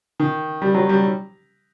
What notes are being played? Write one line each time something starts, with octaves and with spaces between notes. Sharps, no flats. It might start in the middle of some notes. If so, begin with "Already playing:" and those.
D#3
G3
F#3
G3